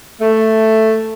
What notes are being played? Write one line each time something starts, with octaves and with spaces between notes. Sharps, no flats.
A3